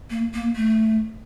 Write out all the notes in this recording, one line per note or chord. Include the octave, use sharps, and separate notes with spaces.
A#3
A#3
A3